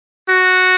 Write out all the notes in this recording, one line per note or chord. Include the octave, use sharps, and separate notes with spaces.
F#4